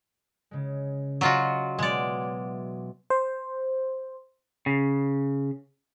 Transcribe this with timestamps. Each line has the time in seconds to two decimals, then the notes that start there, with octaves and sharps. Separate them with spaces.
0.51 C#3 G#3
1.21 F#3 F4 F#4 D5 D#5
1.79 B2 E3 F#3 G#3 D5
3.10 C5
4.66 C#3